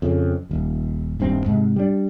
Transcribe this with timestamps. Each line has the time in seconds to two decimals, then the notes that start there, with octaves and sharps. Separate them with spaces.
0.02 F2 C#3
0.50 D#1 D#2
1.20 D#1 G2 C4
1.46 G#2 C3
1.76 G3 D4